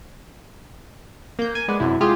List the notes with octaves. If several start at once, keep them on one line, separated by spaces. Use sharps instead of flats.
A#3 G6
G#5
G#3 B3 D5
F#2 C3 E4
G#3 F4 G4 G#4